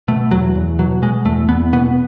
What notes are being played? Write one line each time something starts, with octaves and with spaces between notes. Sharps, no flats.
B2 A3
E2 F#3
E2
B2 F#3
B2 G#3
E2 A3
E2 B3
B2 B3